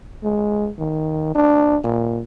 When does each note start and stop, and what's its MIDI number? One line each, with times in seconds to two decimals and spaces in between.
0.23 0.69 56
0.79 1.30 51
1.35 1.77 62
1.84 2.22 46